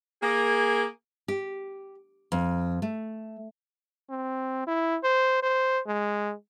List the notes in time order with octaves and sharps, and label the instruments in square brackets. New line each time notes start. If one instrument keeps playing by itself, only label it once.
[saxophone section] A#3 G#4
[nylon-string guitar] G4
F2
A3
[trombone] C4
E4
C5
C5
G#3